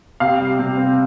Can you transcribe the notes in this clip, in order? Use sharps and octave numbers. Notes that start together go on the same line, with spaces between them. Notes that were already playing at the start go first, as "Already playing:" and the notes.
C3 F5
G3
C3
C4